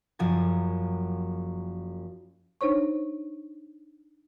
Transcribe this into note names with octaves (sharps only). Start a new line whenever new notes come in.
F#1 F#2 F3 G#5 A6
D4 D#4 C5 C#5 C#6